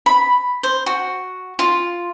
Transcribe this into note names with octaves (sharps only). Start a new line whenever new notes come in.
B5
C5
F#4
F4